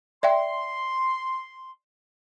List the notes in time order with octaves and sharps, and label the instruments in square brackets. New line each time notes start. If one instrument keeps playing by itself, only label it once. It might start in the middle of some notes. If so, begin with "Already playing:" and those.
[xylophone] D5 E5 G5 [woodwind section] C6